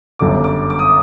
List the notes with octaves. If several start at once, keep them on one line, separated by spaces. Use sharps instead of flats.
G1 F#2 D3 D6
D6
D6
D#6